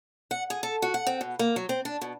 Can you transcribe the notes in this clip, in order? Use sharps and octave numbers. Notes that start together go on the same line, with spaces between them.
F#5
G#4
A4
F#4
F#5
C4
B2
A#3
F#3
C4
D4
B2